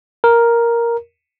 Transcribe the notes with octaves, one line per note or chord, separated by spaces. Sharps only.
A#4